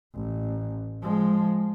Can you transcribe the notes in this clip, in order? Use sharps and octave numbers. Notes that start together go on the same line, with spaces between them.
A1
F3 G#3